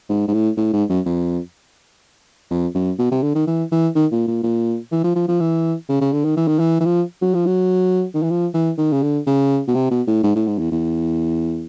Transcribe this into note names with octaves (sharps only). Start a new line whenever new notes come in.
G#2
G#2
A2
A2
G#2
F#2
F2
F2
F#2
B2
C3
D3
D#3
E3
E3
D#3
A#2
A#2
A#2
E3
F3
F3
F3
E3
C#3
C#3
D3
D#3
E3
D#3
E3
E3
F3
F#3
F3
F#3
D#3
E3
F3
E3
D#3
C#3
D3
C#3
B2
C3
B2
A2
G#2
A2
G#2
E2
E2